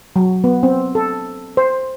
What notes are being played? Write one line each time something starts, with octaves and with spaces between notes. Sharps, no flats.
F#3
B3
C4
A4
C5